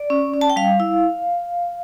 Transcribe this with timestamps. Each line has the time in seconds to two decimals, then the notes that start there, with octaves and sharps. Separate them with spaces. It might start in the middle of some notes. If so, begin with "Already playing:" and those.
Already playing: D5
0.10 C#4
0.34 C#4
0.41 A5
0.50 G5
0.56 G3 F5
0.80 E4